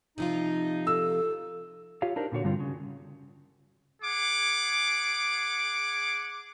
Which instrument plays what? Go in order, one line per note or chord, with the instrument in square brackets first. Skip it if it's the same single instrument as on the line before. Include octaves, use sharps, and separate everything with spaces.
[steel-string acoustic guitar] C3 F3 F4 [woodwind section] D#4
[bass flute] A4 [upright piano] E6
[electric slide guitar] F4 G4 C#5 F5
D4 D#4 A#4 C5
A#2 D3 F#4 C#5
G2 D3 G3 C4 F4
C#3
[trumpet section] G#4 F#5 D6